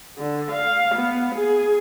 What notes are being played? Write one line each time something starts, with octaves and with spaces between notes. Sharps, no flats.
D3
F5
B3
G#4